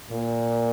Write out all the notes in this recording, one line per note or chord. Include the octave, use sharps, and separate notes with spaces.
A#2